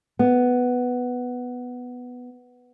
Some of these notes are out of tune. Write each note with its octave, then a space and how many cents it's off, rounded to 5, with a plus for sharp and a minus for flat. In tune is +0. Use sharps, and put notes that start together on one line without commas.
B3 +5